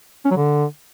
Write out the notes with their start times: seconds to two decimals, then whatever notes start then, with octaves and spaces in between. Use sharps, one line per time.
0.25 C#4
0.31 F#3
0.36 D3